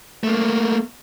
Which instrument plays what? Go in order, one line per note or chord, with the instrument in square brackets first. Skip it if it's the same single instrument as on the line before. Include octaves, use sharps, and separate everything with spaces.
[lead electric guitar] A3 A#3